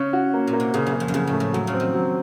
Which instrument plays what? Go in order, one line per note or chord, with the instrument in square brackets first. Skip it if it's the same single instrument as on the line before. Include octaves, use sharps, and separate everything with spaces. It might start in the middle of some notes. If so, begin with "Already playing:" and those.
Already playing: [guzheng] C#3 [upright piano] C#4
[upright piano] F#4
A#3
[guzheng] A#2
[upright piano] A#3
[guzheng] C3
[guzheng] A#2 [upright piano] C#3
[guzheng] F#2
[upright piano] C#3
[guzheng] F2
F#2
[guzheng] F2 [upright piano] C#3
[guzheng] A2
[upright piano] A3
[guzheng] A2
[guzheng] F2 [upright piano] F#3
[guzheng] C#3
[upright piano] C4
[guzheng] D#3
[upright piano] F#3